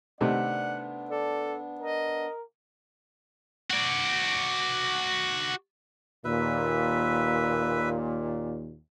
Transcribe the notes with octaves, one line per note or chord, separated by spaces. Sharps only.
C3 D#3 A3 B3 D4 D5 F#5
A4 D5
A#4 D#5
F#4 D5
D#2 A#2 B4 E5